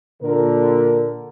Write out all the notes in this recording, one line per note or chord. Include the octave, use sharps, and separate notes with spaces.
A#2 D3 A#4